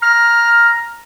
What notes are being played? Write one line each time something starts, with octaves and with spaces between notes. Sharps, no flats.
A#5 F6